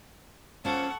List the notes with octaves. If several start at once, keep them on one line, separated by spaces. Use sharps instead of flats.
F3 A#3 C#4 A4 F#5 C#6